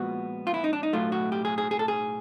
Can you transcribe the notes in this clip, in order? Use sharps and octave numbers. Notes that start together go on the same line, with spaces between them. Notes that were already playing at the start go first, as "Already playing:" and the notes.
Already playing: A#2 F3 G#3 B3 F#4
F4
E4
D#4
D4
D#4
B1 A2 F#3 A3 F4
F#4
G4
G#4
G#4
G#4
A4
G#4